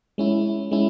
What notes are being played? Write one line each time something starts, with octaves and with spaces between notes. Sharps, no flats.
G#3 C#4 E4
G#3 C#4 E4